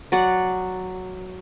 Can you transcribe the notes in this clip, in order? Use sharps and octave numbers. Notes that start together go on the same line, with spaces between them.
F#3 D5 F#5